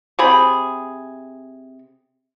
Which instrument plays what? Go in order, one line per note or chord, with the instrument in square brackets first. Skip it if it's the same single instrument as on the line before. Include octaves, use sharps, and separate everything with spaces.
[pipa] C3 G#4 B5